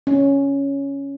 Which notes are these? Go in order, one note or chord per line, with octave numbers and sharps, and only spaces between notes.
C#4